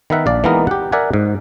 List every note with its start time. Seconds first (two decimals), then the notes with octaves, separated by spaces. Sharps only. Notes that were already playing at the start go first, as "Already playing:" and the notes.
0.10 D#3 B3 A#4 E5 F#5
0.26 A#1 D5 F5
0.44 E3 G#3 A#3 B3 D#4 A#4
0.67 G4 F#5
0.92 A#4 D5 E5 F#5 G#5
1.13 G#2